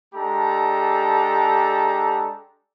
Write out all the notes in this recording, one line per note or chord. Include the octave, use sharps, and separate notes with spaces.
G#3 D4 G4 A4 A5 A#5